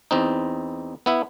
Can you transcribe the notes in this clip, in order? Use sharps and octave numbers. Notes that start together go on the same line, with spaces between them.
E2 C4 D#4
B3 E4 E5